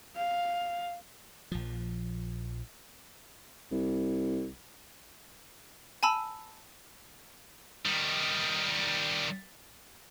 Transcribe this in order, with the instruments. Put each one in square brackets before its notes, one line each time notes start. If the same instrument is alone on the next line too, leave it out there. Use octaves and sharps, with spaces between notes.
[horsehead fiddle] F5
[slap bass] A#1 F3
[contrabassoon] C2
[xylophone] G#5 A5 B5 E6
[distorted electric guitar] D#3 G3